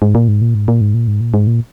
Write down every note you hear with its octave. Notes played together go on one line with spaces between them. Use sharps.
G#2
A#2
G#2
A#2
G#2
A#2
G#2
A#2
G#2
A#2
G#2
A#2